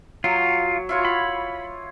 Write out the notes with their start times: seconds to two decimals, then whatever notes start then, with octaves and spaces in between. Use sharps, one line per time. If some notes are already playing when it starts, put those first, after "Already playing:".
0.24 F#3 F4
0.89 E4 F4 C#5
1.05 B5